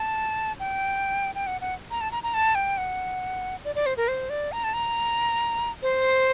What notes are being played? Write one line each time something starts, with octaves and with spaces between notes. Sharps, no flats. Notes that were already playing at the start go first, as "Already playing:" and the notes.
Already playing: A5
G5
G5
F#5
F#5
A#5
A5
A#5
A#5
A5
G5
F#5
D5
D5
C5
A#4
C5
D5
A#5
A5
A#5
C5